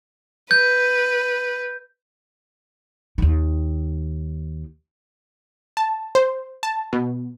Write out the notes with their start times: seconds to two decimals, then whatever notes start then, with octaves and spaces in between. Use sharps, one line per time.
0.51 B4 G6
3.18 D#2 D#3
5.77 A5
6.15 C5
6.63 A5
6.93 B2